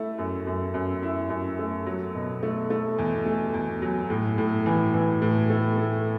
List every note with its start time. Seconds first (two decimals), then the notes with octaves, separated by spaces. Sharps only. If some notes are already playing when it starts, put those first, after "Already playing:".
Already playing: A3 E4
0.18 F#2
0.47 F#2
0.74 F#2
1.03 E4
1.30 F#2
1.59 A3
1.86 F#3
2.15 B2
2.43 A3
2.70 A3
2.98 E2
3.26 A3
3.54 E2
3.82 F#3
4.10 A2
4.38 A2
4.66 E3
4.94 E3
5.22 A2
5.50 A3
5.77 A3